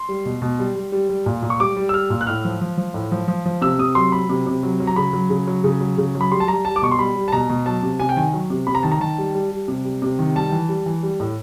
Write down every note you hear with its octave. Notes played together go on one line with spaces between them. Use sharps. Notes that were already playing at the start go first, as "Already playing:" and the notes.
Already playing: C6
G3
B2
B2
G3
G3
G3
G3
A#2
A#2
C#6
G3 D6
G3
E6
G3 F6
A#2
F#6
A2 F6
F3
F3
F3
A2
F3
F3
F3
C3 E6
C3 D#6
F#3 C6
F#3 B5
C3
C3
F#3
F#3
A#5
C#3 B5
F#3
C#3
F#3
C#3
F#3
C#3
F#3
B5
G3 C6
A5
G3 A#5
G3 A5
D6
B2 C#6
C6
G3 B5
G3
A5
B2 A#5
B2
F#3 A5
C3
C3 G#5
G5
D#3 G#5
F#3
C3
C3 B5
A#5
D#3 A5
A#5
D#3 A5
G3
G3
G3
C3
G3
C3
D#3
G3 A5
E3
G3
E3
G3
A2